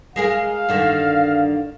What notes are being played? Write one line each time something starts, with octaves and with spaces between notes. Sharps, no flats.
G#3 G#4 A#4 F5
G2 D3 D#3